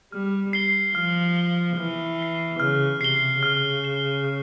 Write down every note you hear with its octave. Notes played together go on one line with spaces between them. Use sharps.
G3 F6
C7 G7
F3 F6
C7 G7
E3 F6
C7 G7
C#3 F6
C3 C7 G7
C#3 F6
C7 E7 G7
F6